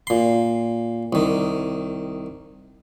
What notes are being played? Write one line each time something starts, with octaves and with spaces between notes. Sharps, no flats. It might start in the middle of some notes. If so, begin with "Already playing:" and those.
A#2 C6
C2 D#3